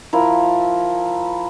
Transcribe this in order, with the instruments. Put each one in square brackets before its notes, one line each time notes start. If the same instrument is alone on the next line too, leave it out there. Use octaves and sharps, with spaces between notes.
[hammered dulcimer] F3 E4 A#4